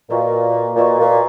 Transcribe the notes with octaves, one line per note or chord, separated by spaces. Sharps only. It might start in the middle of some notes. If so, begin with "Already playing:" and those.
A#2 F#4 B4 D#5 A#5 C#6
A#2 F#4 B4 D#5 A#5 C#6
A#2